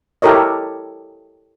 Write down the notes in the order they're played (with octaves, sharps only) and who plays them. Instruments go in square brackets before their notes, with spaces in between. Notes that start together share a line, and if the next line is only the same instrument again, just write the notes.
[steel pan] E4 G4 A4 A#4 C#5 D#5